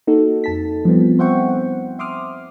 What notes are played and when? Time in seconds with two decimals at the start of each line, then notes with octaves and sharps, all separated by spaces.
0.07 A#3 D#4 F#4 A4
0.44 F2 A5 B6
0.85 F3 G3 B3 C4
1.19 C5 E5 F#5 G5 C#6
1.49 F#5
1.99 E5 C6 D6 D#6 F6